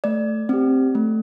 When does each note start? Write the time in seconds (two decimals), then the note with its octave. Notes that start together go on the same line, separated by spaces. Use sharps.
0.04 A3 D5
0.49 C4 G4
0.95 A3